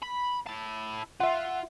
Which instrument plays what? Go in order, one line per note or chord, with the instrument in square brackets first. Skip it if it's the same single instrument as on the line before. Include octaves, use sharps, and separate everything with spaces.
[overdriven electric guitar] B5
E4 A5
[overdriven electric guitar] F4 [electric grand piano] E5 F#5